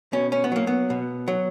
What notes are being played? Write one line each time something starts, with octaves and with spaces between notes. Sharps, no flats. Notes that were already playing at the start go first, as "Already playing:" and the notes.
B2 C#4
C#4
B3
F#3 A#3
B3
B2
F#3